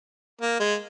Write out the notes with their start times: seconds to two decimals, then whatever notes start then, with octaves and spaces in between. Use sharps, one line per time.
0.42 A#3
0.60 G#3